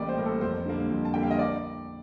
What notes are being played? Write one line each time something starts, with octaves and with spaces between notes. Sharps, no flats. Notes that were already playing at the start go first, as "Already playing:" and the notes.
Already playing: A1 A2 G3 A#3 D5 D#5 G5
C5
A2 G3 A#3 A#4
A4
F2 C5
D3 G3 A#3
F2
A5
D3 G3 A#3 G5
F5
D#5
D5